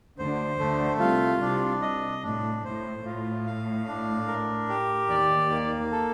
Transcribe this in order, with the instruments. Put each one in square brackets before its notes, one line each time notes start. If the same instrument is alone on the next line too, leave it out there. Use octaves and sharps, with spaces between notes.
[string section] D2 D3 [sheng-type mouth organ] C5
[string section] D2 D3 [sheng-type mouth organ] A3
[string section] C2 C3 [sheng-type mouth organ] F4
[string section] C2 C3 [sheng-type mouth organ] D4
[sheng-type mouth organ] D#5
[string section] A2 [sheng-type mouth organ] D4
[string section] A2 [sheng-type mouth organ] C5
[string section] A2 [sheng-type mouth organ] F4
[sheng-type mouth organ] F5
D4
A#4
G4
[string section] D#2 D#3 [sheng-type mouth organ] D5
[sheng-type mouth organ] A#3
A4